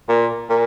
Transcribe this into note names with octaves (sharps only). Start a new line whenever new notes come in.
A#2
A#2